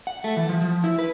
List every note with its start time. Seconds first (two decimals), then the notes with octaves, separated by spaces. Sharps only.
0.07 F#5
0.24 A3
0.37 E3
0.49 F3
0.61 F3
0.84 E4
0.99 B4